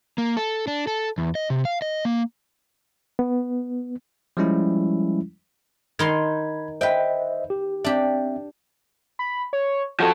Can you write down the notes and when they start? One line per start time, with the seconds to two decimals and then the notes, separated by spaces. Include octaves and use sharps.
0.18 A#3
0.37 A4
0.67 D4
0.87 A4
1.18 E2
1.35 D#5
1.50 C3
1.65 F5
1.82 D#5
2.05 A#3
3.19 B3
4.37 F3 G3 G#3 C#4 E4
5.99 D#3 D#4 B5 C6 G#6
6.81 B4 C5 D#5 E5 G5
7.50 G4
7.84 C4 D4 G4 E5
9.19 B5
9.53 C#5
10.00 F3 F#4 A4